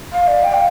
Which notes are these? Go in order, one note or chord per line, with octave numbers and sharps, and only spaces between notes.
F5
D5
G5
F5